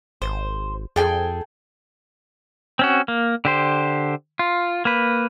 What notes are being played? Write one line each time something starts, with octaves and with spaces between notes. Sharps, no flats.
G#1 C5
F2 G#4 A4 G5 G#5
C4 C#4 F#4
A#3
D3 G4 C5
F4
A#3 B4